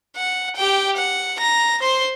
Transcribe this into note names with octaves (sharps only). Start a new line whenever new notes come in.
F#5
G4 G5
F#5
A#5 A#6
C5 C6